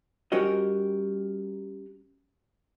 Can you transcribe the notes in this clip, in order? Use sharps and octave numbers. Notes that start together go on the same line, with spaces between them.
G3 C#4 F#4 G4 A#4 D#5